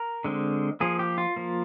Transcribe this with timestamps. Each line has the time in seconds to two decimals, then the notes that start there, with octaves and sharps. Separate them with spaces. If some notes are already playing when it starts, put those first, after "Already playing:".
Already playing: A#4
0.24 D3 G#3 C4
0.80 F3 A#3 G#4
0.99 G4
1.18 F4
1.36 F3 A#3